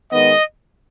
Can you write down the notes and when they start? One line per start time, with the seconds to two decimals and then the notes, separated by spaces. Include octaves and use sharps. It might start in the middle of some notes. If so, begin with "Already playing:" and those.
0.11 D#3 G#3 B3 D#5